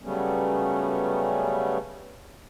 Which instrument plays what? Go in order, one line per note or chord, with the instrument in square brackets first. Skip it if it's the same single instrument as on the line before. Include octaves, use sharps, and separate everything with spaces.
[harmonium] C#3 F#3 G3 A3 B3 C#4